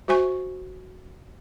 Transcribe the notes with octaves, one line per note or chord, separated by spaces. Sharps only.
F#4 C5 E5 G#5 C#6